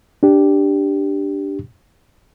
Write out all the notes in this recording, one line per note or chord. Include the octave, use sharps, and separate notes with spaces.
D4 G4